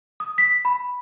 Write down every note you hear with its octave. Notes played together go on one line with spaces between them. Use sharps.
D#6
B6
B5